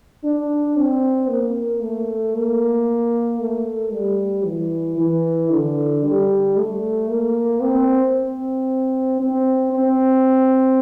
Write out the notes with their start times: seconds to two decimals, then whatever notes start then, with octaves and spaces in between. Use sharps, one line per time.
0.24 D4
0.77 C4
1.29 A#3
1.82 A3
2.35 A#3
3.40 A3
3.93 G3
4.45 E3
4.98 E3
5.51 D3
6.04 G3
6.56 A3
7.09 A#3
7.62 C4
8.14 C4
9.20 C4
9.72 C4